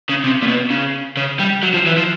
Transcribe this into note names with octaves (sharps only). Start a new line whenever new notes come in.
C#3
C3
A#2
B2
C#3
C#3
G3
F#3
F3
E3
F3